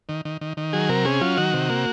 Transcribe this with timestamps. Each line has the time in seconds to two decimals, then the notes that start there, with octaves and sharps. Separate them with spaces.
0.09 D#3
0.25 D#3
0.41 D#3
0.57 D#3
0.73 F#3 G#4
0.89 C3 A#4
1.05 C#4 G#4
1.21 F#3 F4
1.37 D#3 F#4
1.53 C3
1.69 A#3